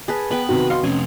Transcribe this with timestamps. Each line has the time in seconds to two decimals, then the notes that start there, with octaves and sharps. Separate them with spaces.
0.08 G#4 B4 A5
0.31 B3 B4 G5
0.49 C3 D#3 F#4
0.70 D#5 F5 C6 C#6
0.84 F2 C3 C#4 G#5